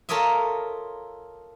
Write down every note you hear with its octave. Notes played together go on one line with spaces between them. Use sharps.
F4 A4 A#4 C#5 D#5 E5